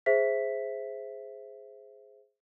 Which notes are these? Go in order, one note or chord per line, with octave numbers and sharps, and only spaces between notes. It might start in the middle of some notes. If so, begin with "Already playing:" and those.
G#4 C5 E5 B6